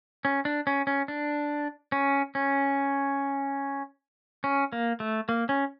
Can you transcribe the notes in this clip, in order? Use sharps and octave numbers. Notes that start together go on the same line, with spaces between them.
C#4
D4
C#4
C#4
D4
C#4
C#4
C#4
A#3
A3
A#3
C#4